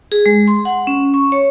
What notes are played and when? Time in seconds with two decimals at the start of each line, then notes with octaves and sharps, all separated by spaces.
0.12 G#4
0.26 G#3
0.48 C6
0.65 F#5
0.87 C#4
1.14 C#6
1.32 C#5